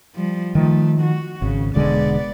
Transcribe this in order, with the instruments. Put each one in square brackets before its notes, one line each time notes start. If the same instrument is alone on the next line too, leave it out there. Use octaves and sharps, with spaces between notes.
[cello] F3 G3
[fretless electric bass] D#3 F3 [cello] A3
[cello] F#4
[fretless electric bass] G#1 [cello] C#3
[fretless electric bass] E1 D3 G#3 [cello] B3 D5